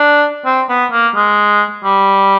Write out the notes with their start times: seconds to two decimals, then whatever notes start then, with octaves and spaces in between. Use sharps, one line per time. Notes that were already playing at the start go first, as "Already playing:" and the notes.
Already playing: D4
0.46 C4
0.69 B3
0.92 A#3
1.15 G#3
1.84 G3